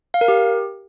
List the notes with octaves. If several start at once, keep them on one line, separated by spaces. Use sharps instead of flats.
F5
A#4
G4